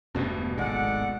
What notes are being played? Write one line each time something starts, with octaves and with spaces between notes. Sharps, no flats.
E1 D2 G2 B2
D1 G#1 G#3 A4 D5 F#5